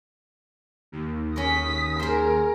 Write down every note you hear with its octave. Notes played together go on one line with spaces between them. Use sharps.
D#2
C#4 A#4 D#6 B6
G#4 A#4 C5